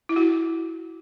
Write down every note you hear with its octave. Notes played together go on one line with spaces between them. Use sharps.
E4
F#4